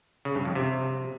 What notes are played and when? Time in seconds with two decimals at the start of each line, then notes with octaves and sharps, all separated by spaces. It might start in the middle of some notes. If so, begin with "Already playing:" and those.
0.25 C#3
0.35 G2
0.45 F2
0.55 C3